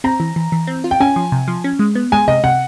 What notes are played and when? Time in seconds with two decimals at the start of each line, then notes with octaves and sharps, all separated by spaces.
0.04 C4 A#5
0.20 E3
0.36 E3
0.52 E3
0.67 C4
0.84 F4
0.91 G5
1.00 C#4 G#5
1.16 F3
1.32 C3
1.48 F3
1.64 C#4
1.79 G#3
1.95 B3
2.12 G#3 G#5
2.28 C3 D#5
2.44 C3 F#5